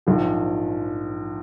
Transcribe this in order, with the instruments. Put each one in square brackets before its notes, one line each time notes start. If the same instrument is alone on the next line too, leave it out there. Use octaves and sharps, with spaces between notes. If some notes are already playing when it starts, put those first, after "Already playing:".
[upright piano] A#1 G#2 F3